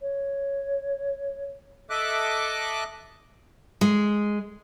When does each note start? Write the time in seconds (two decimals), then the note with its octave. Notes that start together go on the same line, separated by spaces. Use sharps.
0.01 C#5
1.90 A4 D#5 E5 D6 F#6
3.81 G#3